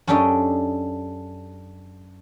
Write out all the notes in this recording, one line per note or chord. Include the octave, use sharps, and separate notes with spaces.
F#2 C#4 D4 G4 A4 D#5